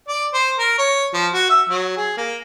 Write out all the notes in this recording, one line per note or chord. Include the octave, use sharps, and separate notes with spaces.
D5
C5
A#4
C#5
F3
F#4
E5
F#3
G#4
A#3